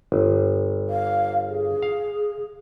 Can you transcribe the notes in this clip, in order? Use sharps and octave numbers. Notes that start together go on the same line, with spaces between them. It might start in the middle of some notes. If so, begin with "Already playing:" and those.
G1
F5
G#4
F5